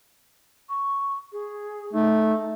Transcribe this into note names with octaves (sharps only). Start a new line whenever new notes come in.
C#6
G#4
A3 D#4